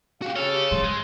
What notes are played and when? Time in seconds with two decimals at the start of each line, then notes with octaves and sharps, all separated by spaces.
0.22 F#4 G4 F5
0.36 G#4 A4 C#5 F6
0.54 G4
0.71 G#2 C#3 C6
0.84 G#3